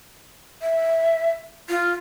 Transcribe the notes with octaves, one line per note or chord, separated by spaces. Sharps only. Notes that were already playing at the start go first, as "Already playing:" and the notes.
E5
F4